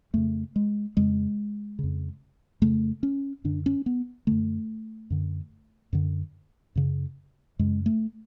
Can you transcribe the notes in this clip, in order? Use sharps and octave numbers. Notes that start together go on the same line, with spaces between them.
F2 C#3 A3
G#3
F2 C#3 G#3
F2 C#3
F2 C#3 A3
C#4
F#2 D3 D4
C#4
B3
F#2 D3 A3
F#2 D3
F#2 D3
F#2 C#3
F#2 C#3 G#3
A3